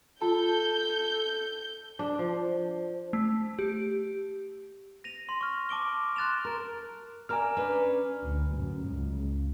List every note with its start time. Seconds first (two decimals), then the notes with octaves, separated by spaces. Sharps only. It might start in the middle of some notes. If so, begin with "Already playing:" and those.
0.22 F4 A4 A5 G6
1.99 D4
2.19 F3
3.13 A3
3.59 G4
5.04 A#6 D#7 F7
5.29 C6
5.41 C#6 F6
5.69 A5 D6 D7 G7
6.16 C6 F#6 A6 E7 F7
6.45 A#4
7.29 A#4 D5 G#5 A#5 F6
7.57 C#4 D4 B4
8.23 D2
8.56 F#2
8.87 C#2